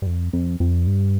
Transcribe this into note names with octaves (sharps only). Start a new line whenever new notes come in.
G2
F2
F2
F2
G2